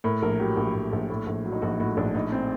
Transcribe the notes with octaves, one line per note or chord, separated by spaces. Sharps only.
A2 A#4
A#1 A#4
F#3 G4
A#1
A2
A#1
A2
A#1
F#3
D#4
A#1 F#4
A2 F#4
A#1 D4
A2 D#4
C4